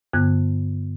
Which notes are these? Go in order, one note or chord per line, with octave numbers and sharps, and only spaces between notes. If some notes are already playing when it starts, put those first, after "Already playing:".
G2 D3 B3 F#6 G#6